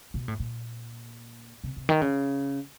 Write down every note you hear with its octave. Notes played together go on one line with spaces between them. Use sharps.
B2
A2
A#2
C3
C3
D#3
C#3